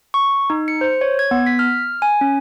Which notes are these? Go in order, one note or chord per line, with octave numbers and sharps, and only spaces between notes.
C#6
D#4
C#7
C5
C#5
G#6
B3
B6
F6
G#5
C#4